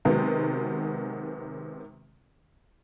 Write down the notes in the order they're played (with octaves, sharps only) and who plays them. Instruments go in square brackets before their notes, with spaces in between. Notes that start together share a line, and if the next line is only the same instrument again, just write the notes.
[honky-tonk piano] C3 D#3 F#3 G#3 B3